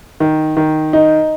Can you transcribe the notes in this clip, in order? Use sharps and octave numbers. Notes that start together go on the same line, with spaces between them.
D#3
D#3
D#4